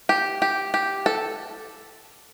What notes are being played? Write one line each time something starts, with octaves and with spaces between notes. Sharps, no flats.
G4
G4
G4
A4